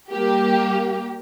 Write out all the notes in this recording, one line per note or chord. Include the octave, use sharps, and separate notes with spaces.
G3 A#3 G4